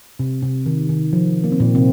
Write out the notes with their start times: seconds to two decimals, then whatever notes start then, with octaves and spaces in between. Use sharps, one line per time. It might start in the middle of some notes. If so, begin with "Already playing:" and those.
0.19 C3
0.42 C3
0.66 D#3
0.89 D#3
1.13 F3
1.44 A#3
1.52 C4
1.60 A#2 A#3
1.75 C3 C4